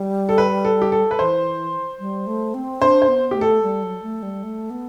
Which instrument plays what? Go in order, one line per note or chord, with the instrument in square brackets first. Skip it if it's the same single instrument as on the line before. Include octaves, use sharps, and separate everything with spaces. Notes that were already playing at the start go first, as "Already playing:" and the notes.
Already playing: [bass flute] G3
[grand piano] A4
B4
A4
G4
A4
B4
[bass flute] E3 [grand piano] C5
[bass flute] G3
A3
C4
[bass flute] D4 [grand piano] C5
[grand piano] C5
[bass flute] B3
[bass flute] A3 [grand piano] G4
[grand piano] A4
[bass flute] G3
F#3
A3
G3
A3
B3